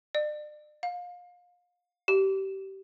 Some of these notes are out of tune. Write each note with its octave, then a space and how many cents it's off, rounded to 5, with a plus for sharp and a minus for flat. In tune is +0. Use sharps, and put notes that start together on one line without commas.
D5 +40
F5 +30
G4 -25